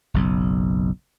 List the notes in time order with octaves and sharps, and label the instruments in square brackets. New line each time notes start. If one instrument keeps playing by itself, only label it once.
[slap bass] F#1 B1